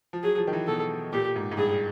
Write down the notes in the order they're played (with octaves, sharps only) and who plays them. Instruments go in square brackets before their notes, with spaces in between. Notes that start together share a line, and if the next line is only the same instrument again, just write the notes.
[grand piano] F3
[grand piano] F#3 [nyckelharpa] G#4
[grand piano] F3
D#3
E3
[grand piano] B2 [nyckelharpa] A4
[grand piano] A#2 [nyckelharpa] G4
[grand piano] G#2
G#2
[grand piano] G2 [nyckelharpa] G#4